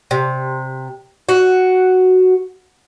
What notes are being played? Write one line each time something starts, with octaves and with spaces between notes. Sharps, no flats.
C3
F#4